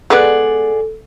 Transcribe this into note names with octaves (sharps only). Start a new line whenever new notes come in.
G#3 B3 G#4 A4 D5 F#5